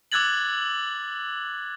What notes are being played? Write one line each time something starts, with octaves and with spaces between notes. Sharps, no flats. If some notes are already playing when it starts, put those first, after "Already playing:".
D6 E6 F#6 G#6 A6 F#7